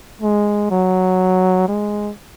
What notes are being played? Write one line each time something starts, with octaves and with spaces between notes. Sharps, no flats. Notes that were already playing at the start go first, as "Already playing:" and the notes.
G#3
F#3
G#3